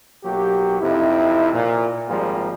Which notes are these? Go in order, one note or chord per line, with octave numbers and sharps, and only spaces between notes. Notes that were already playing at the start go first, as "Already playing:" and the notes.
B1 F#3 A#3 G4
F2 C3 D#4 E4
A#2
G#1 F3 G3 G#3 A#3 G#4